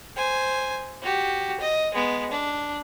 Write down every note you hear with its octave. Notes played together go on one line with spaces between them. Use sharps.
C5 G#5
F#4 G4
D#5
G#3 B3
D4